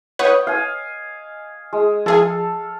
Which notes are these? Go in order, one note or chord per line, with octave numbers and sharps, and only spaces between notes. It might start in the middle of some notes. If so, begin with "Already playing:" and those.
B4 C#5 D#5 F#5 G5
F5 G#5
G#3
F3 G#4 A4 F5 G#5